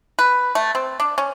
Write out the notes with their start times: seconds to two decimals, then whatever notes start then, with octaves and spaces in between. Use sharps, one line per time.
0.19 B4
0.55 A3
0.75 C4
1.00 D4
1.18 C#4